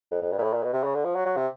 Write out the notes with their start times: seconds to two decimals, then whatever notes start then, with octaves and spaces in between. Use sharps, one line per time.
0.11 F2
0.22 F2
0.32 G2
0.38 A#2
0.43 A2
0.53 A#2
0.64 B2
0.73 C3
0.84 C#3
0.95 D3
1.04 F3
1.15 F#3
1.25 F#3
1.36 C3